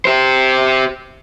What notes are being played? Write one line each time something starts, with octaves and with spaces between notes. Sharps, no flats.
G4 C5